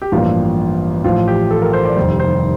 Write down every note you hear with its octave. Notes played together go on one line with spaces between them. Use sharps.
G4
A1 G2 F3 A#3 F4
A1 A2 F3 F4
G4
A4
A#4
C5
D5
F1 D#2 D#3 G3 C5
C5